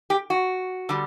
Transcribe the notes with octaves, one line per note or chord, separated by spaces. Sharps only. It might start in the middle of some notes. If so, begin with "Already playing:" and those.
G4
F#4
D3 G3